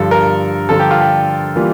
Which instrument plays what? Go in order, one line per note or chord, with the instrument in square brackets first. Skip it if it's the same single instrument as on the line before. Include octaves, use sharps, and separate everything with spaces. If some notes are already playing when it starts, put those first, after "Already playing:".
Already playing: [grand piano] G2 D3 F3 [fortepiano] A4
[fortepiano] A#4
[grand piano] G2 D3 F3 [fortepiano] A4
[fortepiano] G4
F4
G4
[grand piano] E3 G3 A#3 F4